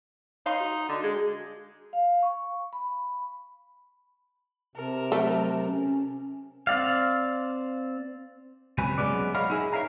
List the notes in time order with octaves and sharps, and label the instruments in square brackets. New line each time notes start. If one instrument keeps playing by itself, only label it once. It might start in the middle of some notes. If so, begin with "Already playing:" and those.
[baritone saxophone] D#4 [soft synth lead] C#5 [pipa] F5 C6
[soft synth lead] F#4
[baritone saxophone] D3
[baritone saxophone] G#3 [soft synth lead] G#4
[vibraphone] F5
C#6
B5
[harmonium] C3 [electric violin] A#4 A5
[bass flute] F#3 [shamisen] A3
[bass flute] C#4
[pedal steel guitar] C4 D5 F5
[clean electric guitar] C#2 C3 F#3 B4 G#5
F#3 G#3 B3 C#4 B4 D5
A#4 C#5 D#5 F5 F#5 B5
D#4 E4 G#4 G#5
A#4 C#5 E5 F5 A#5